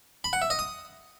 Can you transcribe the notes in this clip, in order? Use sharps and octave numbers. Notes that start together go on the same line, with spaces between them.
B5
F#5
E5
D#5
D#6